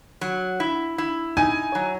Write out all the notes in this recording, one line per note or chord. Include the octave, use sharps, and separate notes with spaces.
F#3
E4
E4
D#4 G#5
F#3